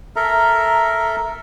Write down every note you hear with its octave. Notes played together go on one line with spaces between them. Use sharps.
A4 A#4 E5 A#5